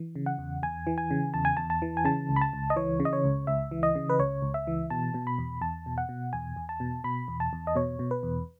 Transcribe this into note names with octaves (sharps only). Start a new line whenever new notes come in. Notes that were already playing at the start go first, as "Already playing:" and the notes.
Already playing: E3
C#3
F#5
E2
E2 G#5
E3
G#5
C#3
E2 A5
G#5
E2 A5
A5
E3
G#5
C#3 A5
C#2
B5
A5
C#2
D#5
E3 C#5
C#3
D#5
C#5
C#2
C#2 E5
E3
D#5
C#3
B4
C#2 C#5
C#2
E5
E3
B2 A5
B2
B5
E2
E2 A5
B2
F#5
B2
E2 G#5
E2
A5
B2
B2 B5
E2
A5
E2
D#5
B2 C#5
B2
B4
E2